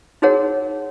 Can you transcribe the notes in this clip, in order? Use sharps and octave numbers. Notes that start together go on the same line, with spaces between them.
D#4 F#4 G#4 A#4 C#5 F#5